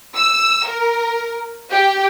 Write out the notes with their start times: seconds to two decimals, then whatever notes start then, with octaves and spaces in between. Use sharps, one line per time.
0.16 E6
0.66 A#4
1.73 G4